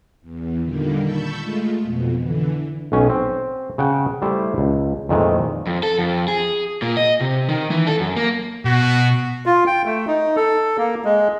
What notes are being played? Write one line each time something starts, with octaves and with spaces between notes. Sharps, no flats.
E2
A#2 D3 D#3 G3 A#3
A5 B5 C#6 E6 G6
G#3 A3 F4
F2 B2
D3 E3
B1 C#4 G#5
C4
C#3 F#5 G5
G3 A3 E4 C5
C#2
F2 A#2 D#3 E3 G#3 A3
F2
A4
F2
G#4
A#2
D#5
C3
D#3
E3
A4
F#2
A#3
B2 F#4
F4
G5
A3
D#4
A4
A#3
G#3